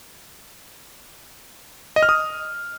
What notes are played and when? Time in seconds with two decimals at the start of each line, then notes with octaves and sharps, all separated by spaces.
1.96 D#5
2.03 F6
2.09 D#6